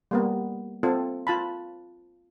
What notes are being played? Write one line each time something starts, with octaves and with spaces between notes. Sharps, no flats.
G3 A#3 B3
C4 F4 A4
F4 A5 B5